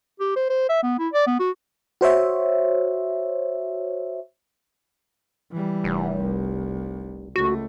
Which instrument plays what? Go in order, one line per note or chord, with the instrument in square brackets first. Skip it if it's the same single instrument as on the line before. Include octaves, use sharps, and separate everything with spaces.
[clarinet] G4
C5
C5
E5
B3
E4
D5
B3
F#4
[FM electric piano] F#4 C5 C#5 E5
[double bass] E3 G3
[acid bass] F1
[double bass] C2
[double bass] C#2 A3 [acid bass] F#4